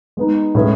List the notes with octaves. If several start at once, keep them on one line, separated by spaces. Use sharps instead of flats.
G#3 B3 D#4
A2 G#3 C#4 G#4 B4